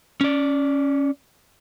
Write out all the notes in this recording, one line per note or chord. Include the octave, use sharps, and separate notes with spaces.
C#4 D5